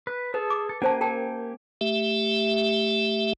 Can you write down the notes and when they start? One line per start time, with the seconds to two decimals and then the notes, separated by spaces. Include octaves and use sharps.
0.07 B4
0.34 G#4 A4 B4 A5
0.50 D6
0.69 A4
0.82 A#3 C#4 G4 C5 G#5 A5
1.01 A#4 G5 A5
1.81 A3 G4 E5